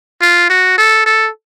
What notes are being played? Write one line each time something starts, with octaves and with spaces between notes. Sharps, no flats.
F4
F#4
A4
A4